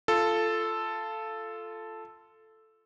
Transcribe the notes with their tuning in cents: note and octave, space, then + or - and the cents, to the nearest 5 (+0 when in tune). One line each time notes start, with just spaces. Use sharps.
F4 -15 A4 +0